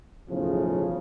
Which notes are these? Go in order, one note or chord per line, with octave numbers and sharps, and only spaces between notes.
B1 E2 A2 C#3 F3